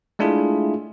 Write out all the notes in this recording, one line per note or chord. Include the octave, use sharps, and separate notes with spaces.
G#3 A3 D4 E4 F4 G#4